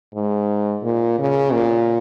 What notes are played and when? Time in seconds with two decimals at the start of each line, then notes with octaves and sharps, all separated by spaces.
0.14 G#2
0.83 A#2
1.19 C#3
1.52 A#2